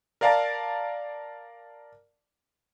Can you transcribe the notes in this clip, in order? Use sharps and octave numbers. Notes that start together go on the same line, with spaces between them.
A#4 D5 F5 A5 A#5